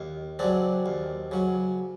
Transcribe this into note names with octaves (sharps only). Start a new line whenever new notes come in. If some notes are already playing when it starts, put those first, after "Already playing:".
Already playing: D#2
C#3 F#3 C4 D4
D#2
C#3 F#3